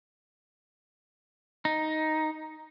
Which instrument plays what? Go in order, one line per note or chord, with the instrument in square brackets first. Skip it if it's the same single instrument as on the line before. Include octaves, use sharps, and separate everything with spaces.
[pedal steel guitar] D#4